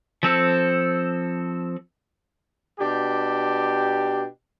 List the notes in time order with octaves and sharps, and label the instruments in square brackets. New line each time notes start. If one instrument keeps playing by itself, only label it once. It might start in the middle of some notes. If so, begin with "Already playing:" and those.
[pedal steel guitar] F3 C4 A4
[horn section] B2 D4 G4